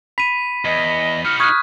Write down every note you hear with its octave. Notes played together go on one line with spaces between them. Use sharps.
B5 B6 D#7
E2 D#5
D#4 F#4 F6
C#6 D#6 F6 F#6 G#6